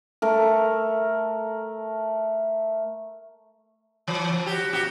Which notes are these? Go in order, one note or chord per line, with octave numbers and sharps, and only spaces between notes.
A3 A#4
E3
F3
F#4 G4
A#2 F#4 G4